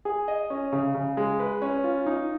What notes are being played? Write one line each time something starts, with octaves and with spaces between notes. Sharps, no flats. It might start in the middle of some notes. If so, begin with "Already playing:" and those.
G#4
D#5
C#4
C#3
C#3
G#3
B4
C#4
F4
D#4